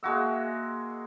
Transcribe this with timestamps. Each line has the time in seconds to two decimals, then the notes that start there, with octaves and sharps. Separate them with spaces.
0.03 G#3 A#3 F#4 E5